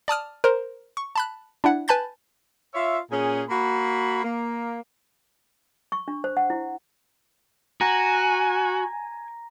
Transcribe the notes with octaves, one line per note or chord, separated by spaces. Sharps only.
D5 A5 D#6 F6
A#4 C5
C#6
A5 B5 F#6
D4 E4 F#5
B4 G#5 A5 B5 G6 A6
F4 C#5 E5
A#2 C#4 G#4
A#3 F#4 B5
A#3
C#6
D4
C5
F#5
E4
F#4 G#5 A#5 A#6